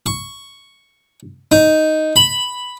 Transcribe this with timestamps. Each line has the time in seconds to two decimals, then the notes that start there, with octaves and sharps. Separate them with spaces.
0.06 C#6
1.52 D#4
2.16 B5